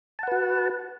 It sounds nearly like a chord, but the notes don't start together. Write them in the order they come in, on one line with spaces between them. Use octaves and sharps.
A5 F#5 B4 F#4